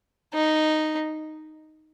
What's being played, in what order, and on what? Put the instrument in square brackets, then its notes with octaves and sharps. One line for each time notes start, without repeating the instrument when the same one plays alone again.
[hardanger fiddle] D#4